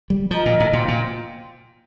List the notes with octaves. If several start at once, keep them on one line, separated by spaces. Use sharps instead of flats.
G3
F3 A#4 D#5 A#5
A#2
A2
A#2 F4 C5 G5 C6
A#2